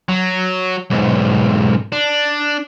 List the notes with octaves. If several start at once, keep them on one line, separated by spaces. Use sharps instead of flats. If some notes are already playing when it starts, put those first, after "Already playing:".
F#3
B1 G#2
D4